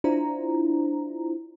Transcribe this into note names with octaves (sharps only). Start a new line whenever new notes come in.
D4 E4 F4 C5 A#5